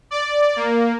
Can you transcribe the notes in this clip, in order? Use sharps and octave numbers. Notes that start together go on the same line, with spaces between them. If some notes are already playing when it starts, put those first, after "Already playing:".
D5
A#3